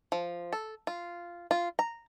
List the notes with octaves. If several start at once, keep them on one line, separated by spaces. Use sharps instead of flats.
F3
A4
F4
F4
A#5